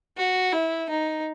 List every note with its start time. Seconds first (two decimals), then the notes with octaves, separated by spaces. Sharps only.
0.17 F#4
0.53 E4
0.89 D#4